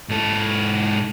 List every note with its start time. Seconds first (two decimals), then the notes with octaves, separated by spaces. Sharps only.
0.09 G#2 A4